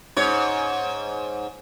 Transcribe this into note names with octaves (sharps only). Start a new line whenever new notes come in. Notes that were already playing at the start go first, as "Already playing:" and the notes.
G#2 C#5